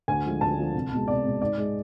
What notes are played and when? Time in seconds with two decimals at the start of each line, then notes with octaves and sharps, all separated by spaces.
0.08 D2 G#5
0.25 D3 F3 G#3
0.41 D2 A5
0.58 D3 F3 G#3
0.74 C2
0.92 B2 G#3
1.08 C2 D5
1.25 B2 G#3
1.41 G#2 D5
1.58 G#3